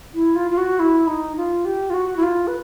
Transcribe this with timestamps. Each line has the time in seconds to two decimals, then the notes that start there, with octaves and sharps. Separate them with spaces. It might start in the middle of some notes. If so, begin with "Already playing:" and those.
0.14 E4
0.36 F4
0.51 F4
0.57 F#4
0.79 E4
1.07 D#4
1.37 F4
1.65 G4
1.90 F4
1.94 F#4
2.17 E4
2.23 F4
2.47 B4